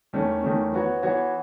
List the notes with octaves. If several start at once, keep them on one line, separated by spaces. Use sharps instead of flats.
E2 D#3 A3 C#4
E2 D#3 A3 C#4
E3 B3 F#4 C#5
E3 B3 F#4 C#5